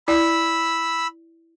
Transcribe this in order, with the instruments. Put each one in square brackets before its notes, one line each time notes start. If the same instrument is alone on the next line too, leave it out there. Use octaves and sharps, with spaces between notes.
[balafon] E4 D5 [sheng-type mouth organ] B5 E6